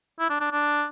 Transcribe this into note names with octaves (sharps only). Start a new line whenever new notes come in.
E4
D4
D4
D4